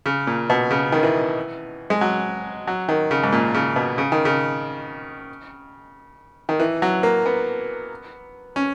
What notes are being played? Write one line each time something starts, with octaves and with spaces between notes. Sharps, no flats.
C#3
A#2
B2
C#3
D#3
E3
G#3
F#3
F#3
D#3
C#3
G#2
A#2
C#3
B2
C#3
D#3
C#3
D#3
E3
F#3
A#3
B3
C#4